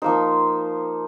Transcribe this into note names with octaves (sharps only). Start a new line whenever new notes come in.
F3 A#3 D#4 C5